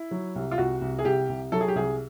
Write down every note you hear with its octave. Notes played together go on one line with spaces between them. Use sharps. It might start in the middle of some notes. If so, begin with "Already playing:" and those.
Already playing: E4
F#3
C2
F4
C2 F#4
C2
G#4
C2 G4
C2
F#3 A4
G#4
G4
C2 G#4